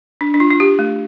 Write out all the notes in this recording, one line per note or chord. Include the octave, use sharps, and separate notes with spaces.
D4
D4
F4
F4
G4
A3